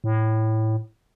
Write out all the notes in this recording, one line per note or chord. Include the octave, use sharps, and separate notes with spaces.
A2